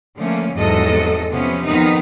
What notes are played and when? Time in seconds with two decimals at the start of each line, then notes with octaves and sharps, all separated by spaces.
0.17 D3 F3 A3 A#3 C#4
0.54 E2 G#2 C3 F#3 A4 D#5
1.31 C3 F3 B3 C#4
1.64 F2 D#3 B3 D#4